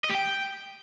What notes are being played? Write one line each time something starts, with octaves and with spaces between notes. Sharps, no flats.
D#5
G4
G5